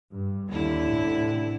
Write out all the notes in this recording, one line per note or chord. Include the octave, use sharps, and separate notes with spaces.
G2
D#2 D3 E4
A1 C3